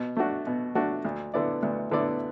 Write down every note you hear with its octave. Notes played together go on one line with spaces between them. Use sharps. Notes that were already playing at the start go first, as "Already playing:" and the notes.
Already playing: B2
A3 D4 F#4
B2
A3 D4 F#4
D2
D3 B3 E4 D5
D2
D3 B3 E4 D5